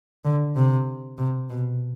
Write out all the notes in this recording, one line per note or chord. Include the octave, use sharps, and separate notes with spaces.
D3
C3
C3
B2